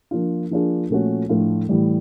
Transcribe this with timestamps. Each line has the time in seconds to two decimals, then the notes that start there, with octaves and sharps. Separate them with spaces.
0.11 F3 A#3 D4 F4
0.51 F3 A#3 D4 F4 G#4
0.90 A#2 F3 A3 C#4 F#4
1.29 A2 F3 A3 D4 F4
1.69 A2 E3 G3